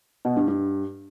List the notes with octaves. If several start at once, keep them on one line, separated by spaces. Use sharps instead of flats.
B2
G2
G2